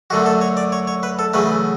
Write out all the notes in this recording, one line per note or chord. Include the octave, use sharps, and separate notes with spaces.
F#2 D3 F#3 A3 F#4
A4
C#5
D5
C#5
C#5
B4
A4
E2 C#3 F#3 A3 B4